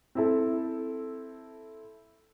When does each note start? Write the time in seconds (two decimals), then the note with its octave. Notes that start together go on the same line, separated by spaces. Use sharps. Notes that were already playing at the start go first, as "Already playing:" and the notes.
0.15 C4 E4 A4